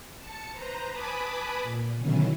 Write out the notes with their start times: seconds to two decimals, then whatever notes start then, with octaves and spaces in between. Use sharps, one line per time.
0.18 A5 C#7
0.51 B4 C5 A#5
0.91 B4 G#5 A5 B5 D6 D#6
1.62 A#2
1.96 B2 D3 D#3 F#3 C#4 E4